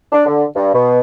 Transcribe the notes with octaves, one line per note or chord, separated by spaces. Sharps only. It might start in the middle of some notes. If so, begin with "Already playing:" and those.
D4
D3
G2
B2